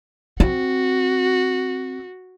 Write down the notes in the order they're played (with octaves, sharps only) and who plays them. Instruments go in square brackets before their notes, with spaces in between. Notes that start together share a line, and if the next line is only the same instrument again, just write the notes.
[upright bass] C4 [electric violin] F#4